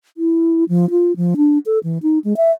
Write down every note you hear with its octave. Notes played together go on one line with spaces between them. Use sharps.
E4
F3
F4
F3
D4
A4
E3
D#4
G#3
E5